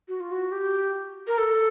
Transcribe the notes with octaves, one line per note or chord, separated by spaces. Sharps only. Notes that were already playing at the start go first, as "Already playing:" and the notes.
F#4
F4
F#4
G4
A#4
A4